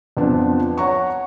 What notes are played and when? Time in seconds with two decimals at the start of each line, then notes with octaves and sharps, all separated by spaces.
0.17 F2 F3 B3 D4
0.78 C#5 F#5 A#5 C#6